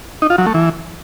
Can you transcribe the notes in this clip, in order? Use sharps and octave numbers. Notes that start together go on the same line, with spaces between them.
D#4
F4
F#3
A3
E3